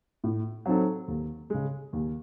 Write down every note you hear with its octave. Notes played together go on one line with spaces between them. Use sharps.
A2
F#3 C4 D#4 A4
D#2
C#3 G#3
D#2